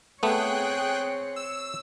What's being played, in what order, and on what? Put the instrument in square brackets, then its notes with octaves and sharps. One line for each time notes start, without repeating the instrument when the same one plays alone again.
[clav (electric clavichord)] A3 B3 [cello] C4 C#5 [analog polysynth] G#4 G5 F#6
[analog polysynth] E6